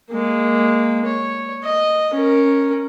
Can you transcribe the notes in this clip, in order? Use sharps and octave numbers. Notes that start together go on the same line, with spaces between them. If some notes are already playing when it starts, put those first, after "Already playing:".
G#3 A#3
C#5
D#5
C#4 A#4